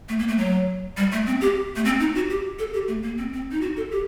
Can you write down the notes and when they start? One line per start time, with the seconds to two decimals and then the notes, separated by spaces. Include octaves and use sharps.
0.09 A3
0.19 A#3
0.28 A3
0.38 F#3
0.97 G3
1.12 A3
1.27 C4
1.41 G4
1.76 A3
1.85 C4
2.00 D#4
2.15 F#4
2.30 G4
2.59 A4
2.73 G4
2.88 A3
3.02 A#3
3.18 C4
3.33 C4
3.51 D#4
3.61 F#4
3.77 A4
3.91 G4